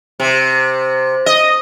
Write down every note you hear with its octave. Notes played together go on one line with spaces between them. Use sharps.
C3
D#5